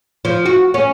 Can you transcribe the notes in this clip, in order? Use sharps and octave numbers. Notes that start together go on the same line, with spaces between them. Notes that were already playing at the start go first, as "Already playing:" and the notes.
F3
F#4
C#4